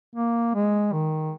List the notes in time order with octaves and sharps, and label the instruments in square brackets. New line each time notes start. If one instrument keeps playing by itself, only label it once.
[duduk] A#3
G#3
D#3